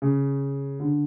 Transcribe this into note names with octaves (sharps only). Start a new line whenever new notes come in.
C#3
D3